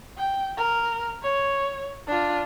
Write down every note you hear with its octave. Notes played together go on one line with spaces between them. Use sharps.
G5
A#4
C#5
D4 F4